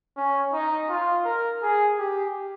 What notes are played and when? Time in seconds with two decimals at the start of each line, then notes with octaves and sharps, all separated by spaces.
0.17 C#4
0.53 D#4
0.89 F4
1.25 A#4
1.62 G#4
1.98 G4